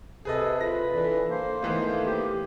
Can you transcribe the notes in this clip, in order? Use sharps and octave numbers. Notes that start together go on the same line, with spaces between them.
C3 G#4 A4 B4 D#5
F4 B4 A#6
E3 D4 A4
A#3 C5
D#3 E3 A3 B3
G4